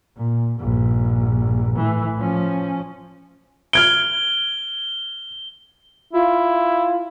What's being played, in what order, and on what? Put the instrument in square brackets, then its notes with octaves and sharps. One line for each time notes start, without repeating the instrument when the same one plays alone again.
[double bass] A#2
A#1 G2
A2 E3
F3 C#4
[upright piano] F6 G#6 D7 [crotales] G7
[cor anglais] E4 [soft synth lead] F4